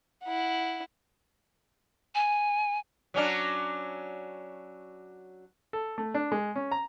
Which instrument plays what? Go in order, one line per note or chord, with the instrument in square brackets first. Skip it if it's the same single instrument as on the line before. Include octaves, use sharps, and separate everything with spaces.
[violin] E4 F#5
[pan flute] G#5
[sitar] F#3 C#4 D4
[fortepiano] A4
A3
D4
G#3
C#4
A#5